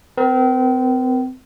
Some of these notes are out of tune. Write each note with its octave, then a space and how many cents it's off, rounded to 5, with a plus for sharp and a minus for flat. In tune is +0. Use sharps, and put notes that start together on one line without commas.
C4 -35 A#4 +25